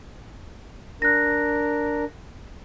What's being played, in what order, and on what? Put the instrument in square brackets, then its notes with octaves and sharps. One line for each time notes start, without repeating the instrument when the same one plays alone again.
[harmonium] D4 A#4 [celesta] F#6 A#6